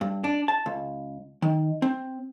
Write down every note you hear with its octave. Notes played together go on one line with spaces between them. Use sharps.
G2
D4
A5
C#2
D#3
C4